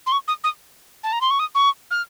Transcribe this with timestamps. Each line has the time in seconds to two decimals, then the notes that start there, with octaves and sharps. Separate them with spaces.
0.06 C6
0.12 C#6
0.28 D#6
0.44 D#6
1.04 A5
1.13 A#5
1.21 C6
1.30 C#6
1.39 D#6
1.55 C#6
1.91 F6